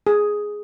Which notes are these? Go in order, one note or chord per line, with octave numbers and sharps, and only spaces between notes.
G#4